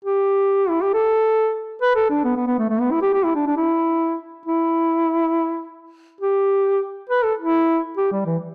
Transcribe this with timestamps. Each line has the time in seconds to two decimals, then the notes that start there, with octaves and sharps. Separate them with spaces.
0.05 G4
0.69 E4
0.81 G4
0.94 A4
1.82 B4
1.95 A4
2.10 D4
2.24 B3
2.36 B3
2.47 B3
2.59 A3
2.69 A3
2.81 B3
2.92 E4
3.02 G4
3.14 G4
3.23 E4
3.35 D4
3.47 D4
3.57 E4
4.46 E4
6.21 G4
7.09 B4
7.23 A4
7.38 E4
7.97 G4
8.12 G3
8.26 E3